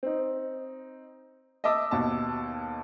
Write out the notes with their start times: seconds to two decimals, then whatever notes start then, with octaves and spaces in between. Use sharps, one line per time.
0.03 C4 D#4
1.64 D#5 E5 A5 D6 E6
1.91 D#2 B2 A5